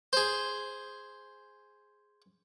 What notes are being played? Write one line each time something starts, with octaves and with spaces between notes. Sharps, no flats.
G#4 C5